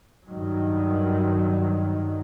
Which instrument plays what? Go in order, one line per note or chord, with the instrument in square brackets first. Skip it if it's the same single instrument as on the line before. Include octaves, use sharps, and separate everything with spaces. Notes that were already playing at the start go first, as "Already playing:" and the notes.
[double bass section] G2 D#3 F#3